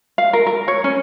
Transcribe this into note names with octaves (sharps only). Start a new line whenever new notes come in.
F5
A#4
A#4
C#5
C#4